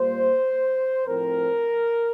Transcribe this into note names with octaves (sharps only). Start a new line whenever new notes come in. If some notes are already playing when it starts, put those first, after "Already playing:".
Already playing: A#2 G3 A#3 C5
A2 F3 C4 A#4